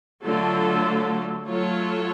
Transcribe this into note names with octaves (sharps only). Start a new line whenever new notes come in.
D3 F#3 A3 F4 A4
F#3 A3 F4 A4 C#5